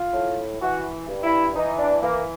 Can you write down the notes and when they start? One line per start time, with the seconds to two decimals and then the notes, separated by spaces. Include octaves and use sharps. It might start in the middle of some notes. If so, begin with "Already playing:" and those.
Already playing: F4
0.13 A2
0.61 E3 F#4
1.08 G2
1.24 E4
1.55 E3 D#4
1.79 D4
2.03 E3 A#3